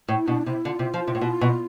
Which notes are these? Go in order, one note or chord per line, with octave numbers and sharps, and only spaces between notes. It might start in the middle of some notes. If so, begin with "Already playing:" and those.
A2 E4
B2 D4
C3 E4
D3 F4
C3
F3
C3
A2
B2
B2